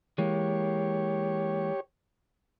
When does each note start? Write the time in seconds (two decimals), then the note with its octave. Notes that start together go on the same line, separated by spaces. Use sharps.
0.18 E3 G#3 A#3 G4 C#5